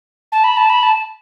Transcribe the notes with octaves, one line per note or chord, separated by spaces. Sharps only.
A5
B5
A5
B5
A5